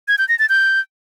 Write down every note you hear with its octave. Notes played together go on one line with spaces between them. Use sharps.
G#6
G6
A#6
A6
G6